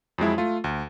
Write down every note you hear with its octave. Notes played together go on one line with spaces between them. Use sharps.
F2 F#3 G#3 E4
A3 F4
D2